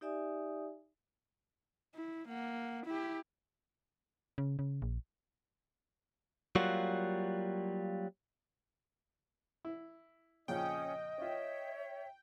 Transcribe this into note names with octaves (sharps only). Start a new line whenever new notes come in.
D#4 G4 D5 E5 G#5 D#6
E4
A#3 F#5
E4 G4
C#3
C#3
A#1
F#3 G3 A#3 F4 F#4
E4
F2 A#2 C#3 C#4 D#5 G5 D#6
C#4 F4 C#5 E5